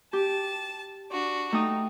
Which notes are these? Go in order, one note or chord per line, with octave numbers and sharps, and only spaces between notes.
G4 A5
D4 F#4
A3 D#4 G5 D#6